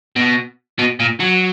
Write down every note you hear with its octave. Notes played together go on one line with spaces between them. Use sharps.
B2
B2
A#2
F#3